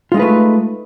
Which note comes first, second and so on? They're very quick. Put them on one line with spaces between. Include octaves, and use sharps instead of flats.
F4 G#3 D#4 B4 A3